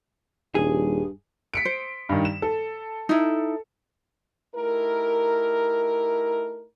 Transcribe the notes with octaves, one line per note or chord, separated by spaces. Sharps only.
D#1 G2 G#4
B6 C#7 D7
C5
G2 D#3
E7
A4
D#4 E4
A3 D#4 E4 G4 A#4